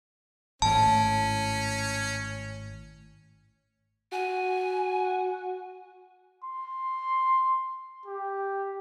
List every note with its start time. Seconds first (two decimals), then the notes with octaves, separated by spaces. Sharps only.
0.62 G#1 A2 C#4 A5
4.12 F#4 G#5
6.44 C6
8.06 G4